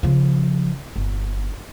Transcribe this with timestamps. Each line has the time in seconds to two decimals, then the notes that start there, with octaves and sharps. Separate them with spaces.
0.03 C#3 F3
0.96 G1